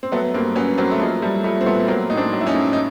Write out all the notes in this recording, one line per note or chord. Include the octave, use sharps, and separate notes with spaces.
C4
F#3 A3 B3
G2 A#3 C4
F#3 B3 C#4
F#3 A#3 C4
A3
F3 G#3 A#3
F3 G3 A3
F3 G3 A3
C4
A#2 A3 B3
F#3 A#3 C4
A2 D#4
C4 D4
F#3
E4
C#4 D#4
A2
D#4